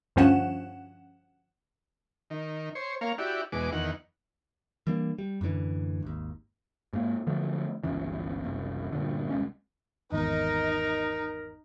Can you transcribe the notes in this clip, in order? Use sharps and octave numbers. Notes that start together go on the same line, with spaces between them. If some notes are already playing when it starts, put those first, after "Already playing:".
D2 G2 F3 C#4 F#5 E7
D#3
C5 C#5
A#3 C#5 F5
E4 F#4 G4 D5
E2 B2 G#3 D6
E2 D#3 F#5
E3 G3 A#3 D4
G3
F#2 A2 D3 E3
G#1 D#2
G#2 A#3
D3 F3 F#3 A3
G1 C#2 C#3 E3
F#1 C2
G2 A#2 D3
D#1 C2 G#3 C#4
G#1 E2 D#4 A#4 D#5